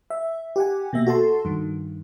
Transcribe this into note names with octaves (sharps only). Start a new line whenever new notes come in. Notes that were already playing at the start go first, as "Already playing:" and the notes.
E5
G4 F#5 G#5
B2 A#3 E5 A#6
F#4 A4 A5 C6
G2 D#3